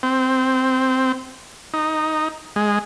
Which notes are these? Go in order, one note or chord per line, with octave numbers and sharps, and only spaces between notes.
C4
D#4
G#3